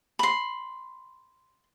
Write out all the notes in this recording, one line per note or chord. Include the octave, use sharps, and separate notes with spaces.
B5 C6